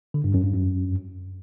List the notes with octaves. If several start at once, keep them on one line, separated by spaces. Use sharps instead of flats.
D3
G2
F#2
G2
F#2